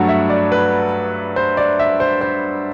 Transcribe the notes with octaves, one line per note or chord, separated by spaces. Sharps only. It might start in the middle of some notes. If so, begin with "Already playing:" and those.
Already playing: G2 F#3 A3 F#5
E5
D5
B4
C5
D5
E5
C5
C5